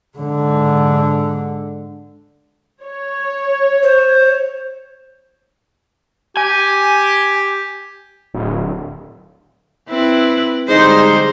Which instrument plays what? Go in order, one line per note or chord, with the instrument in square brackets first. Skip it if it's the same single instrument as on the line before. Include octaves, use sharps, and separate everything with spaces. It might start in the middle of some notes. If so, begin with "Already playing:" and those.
[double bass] G#2 D3
[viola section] C#5
[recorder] C5
[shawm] G4 [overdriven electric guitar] G#5
[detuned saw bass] D1
[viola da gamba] C4 E4 B4
[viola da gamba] D3 G3 [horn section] G#3 D#4 [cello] C5